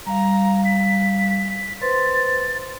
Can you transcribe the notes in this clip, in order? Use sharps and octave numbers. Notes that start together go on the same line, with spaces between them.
G3 F5 A#5
B6
B4 C5 C6 A6